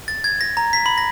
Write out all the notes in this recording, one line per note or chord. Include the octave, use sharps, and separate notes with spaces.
A6
G#6
A#6
A#5
B6
B5
A#6